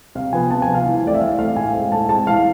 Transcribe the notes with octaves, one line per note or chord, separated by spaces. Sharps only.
C3 F5
F3 B3 G#5
C3 A5
G#5
F3 B3
F5
E3
A3 C4 D5
E5
E3 F5
A3 C4 F5
A2 G#5
G#3 C4
A2 A5
G#3 C4 A5
E3 F5